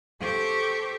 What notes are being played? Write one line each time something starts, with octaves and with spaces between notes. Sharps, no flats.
G4 A4 C5 C#6